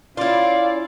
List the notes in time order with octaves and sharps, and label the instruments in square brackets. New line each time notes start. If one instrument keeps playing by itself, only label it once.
[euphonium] C#4 [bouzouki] E4 F4 [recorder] D5 [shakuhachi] F5